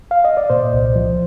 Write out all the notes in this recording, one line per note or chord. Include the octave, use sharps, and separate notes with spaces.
F5
D#5
D5
A#2 C5
C2
F3